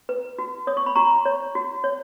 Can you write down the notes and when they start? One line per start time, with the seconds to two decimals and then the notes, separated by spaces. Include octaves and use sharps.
0.09 B4
0.38 F#4
0.67 C#5 D#6
0.77 C#6
0.86 B5
0.95 F#4 A#5 C#6
1.25 C#5
1.55 F#4
1.84 C#5